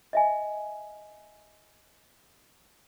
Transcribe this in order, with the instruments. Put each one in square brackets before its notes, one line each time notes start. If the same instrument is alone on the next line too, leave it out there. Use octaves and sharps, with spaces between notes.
[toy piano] D#5 E5 G#5